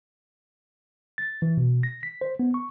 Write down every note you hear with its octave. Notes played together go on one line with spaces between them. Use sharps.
A6
E3
B2
A#6
B6
C5
B3
C#6